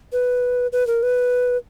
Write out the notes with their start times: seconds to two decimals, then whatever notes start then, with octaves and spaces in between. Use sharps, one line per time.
0.13 B4
0.72 B4
0.87 A#4
1.03 B4